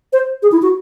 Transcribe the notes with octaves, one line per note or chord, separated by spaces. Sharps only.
C5
G#4
E4
F#4